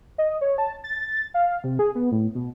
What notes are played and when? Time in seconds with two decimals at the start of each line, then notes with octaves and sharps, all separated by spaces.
0.18 D#5
0.41 C#5
0.58 A5
0.84 A6
1.34 F5
1.64 C3
1.79 G#4
1.95 B3
2.12 A2
2.35 B2